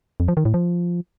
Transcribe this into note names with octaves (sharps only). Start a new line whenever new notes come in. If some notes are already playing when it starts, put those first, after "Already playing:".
F2
F3
D#3
A2
F3